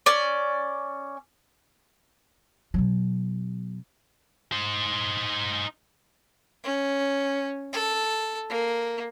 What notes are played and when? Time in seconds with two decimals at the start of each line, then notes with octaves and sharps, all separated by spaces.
0.06 C#4 D5
2.74 B2 F#3
4.52 D#4 C5
6.64 C#4
7.73 A4
8.49 A#3